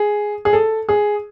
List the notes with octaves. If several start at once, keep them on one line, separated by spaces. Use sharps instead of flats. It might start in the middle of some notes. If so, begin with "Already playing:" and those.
Already playing: G#4
G#4
A4
G#4